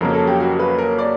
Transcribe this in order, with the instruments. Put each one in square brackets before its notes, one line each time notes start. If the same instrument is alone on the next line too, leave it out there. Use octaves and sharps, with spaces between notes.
[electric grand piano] F2 C#3 F#3 A#3 C#4 [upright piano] A#4
[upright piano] A4
G4
F#4
B4
A#4
D5